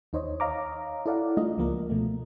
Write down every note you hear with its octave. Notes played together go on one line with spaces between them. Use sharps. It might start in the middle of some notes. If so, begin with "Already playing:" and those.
D#2 D#4 C5 C#5 D#5
C#5 D#5 F5 A#5 D6
E4 A4 D5 F5 F#5
G#3 A3 D4 F4 D5 D#5
C#2 F3 A#3 A#4
B2 F3 A3